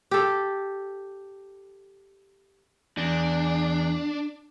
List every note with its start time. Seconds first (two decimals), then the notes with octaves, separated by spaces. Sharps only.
0.11 G4 A4
2.97 E2 D4